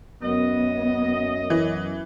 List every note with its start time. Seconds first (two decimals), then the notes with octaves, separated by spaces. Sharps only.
0.23 F#2 B3 D#5
1.50 E3